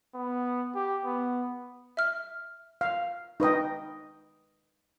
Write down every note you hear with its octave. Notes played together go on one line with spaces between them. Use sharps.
B3
G4
B3
E5 F6
F5
D#4 B4 D#5 G5